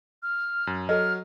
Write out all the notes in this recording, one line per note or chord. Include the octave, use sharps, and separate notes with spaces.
F6
F#2
F#3 A4 D#5 F6